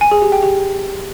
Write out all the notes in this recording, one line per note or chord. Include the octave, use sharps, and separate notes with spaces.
G#5
G#4
G4
G5
G4